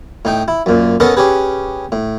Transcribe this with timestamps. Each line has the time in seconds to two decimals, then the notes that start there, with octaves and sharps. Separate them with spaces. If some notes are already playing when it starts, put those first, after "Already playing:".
0.25 A2 D#4 G5
0.48 E4
0.66 F#2 A#2
1.00 B3 C#4 A4 A#4 D#5 F#5
1.17 C#4 G4 G#4 B4
1.92 A2